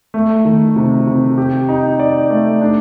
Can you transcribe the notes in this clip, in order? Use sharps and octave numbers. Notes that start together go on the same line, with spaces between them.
A3
D#3
C3
C3
G4
D#4
D5
A3
D4